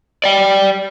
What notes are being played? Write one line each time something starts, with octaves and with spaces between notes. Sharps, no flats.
D5 G5